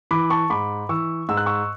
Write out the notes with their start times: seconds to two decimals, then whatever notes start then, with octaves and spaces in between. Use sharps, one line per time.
0.11 E3 B5 D6
0.30 A5 C#6
0.50 G#2 B5 D6
0.89 E3 C#6 E6
1.29 G#2 E6
1.37 F#6
1.46 C#6 E6